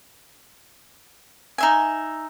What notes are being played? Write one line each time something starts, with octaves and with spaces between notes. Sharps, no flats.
D#4 E5 G#5